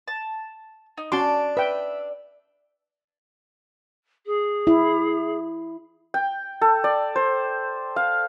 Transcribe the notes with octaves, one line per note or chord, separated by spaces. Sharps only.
A5
D#4
C#4 D4 F#4 A5 C6 D6
B4 E5 G5
G#4
E4
G5
A4
D5
C5
F5